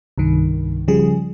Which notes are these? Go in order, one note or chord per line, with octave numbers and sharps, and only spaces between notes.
C2 G2 D#3
C#3 F3 G3 G#4